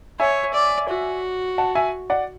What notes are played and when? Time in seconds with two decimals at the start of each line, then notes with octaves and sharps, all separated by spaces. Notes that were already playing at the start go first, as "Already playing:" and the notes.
0.19 C#5 E5 G#5
0.54 D5
0.89 F#4
1.58 F#5 A5
1.75 E5 G#5
2.10 D5 F#5